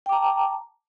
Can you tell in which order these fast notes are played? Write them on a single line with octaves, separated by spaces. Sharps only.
G5 D6 A#5 A5